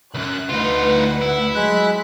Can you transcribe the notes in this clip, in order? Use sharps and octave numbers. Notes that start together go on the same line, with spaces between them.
C#2 F#2 F#6
D2 D#4 F4 B4 F#5
E4
F#3 G#3 F#6 B6